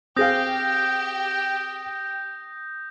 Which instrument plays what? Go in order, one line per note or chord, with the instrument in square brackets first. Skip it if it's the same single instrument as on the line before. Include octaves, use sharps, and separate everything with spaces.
[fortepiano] C4 G#4 F5 [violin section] G4 [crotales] D#6 G6 A#6